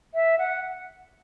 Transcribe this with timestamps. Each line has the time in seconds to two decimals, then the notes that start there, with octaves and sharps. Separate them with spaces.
0.14 E5
0.38 F#5